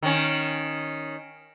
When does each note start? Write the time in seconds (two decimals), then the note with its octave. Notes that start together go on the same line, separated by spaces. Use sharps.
0.03 D#3 C#4